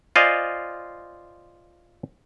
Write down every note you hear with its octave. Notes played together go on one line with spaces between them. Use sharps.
F4 C5 D5 D#5 F5 G#5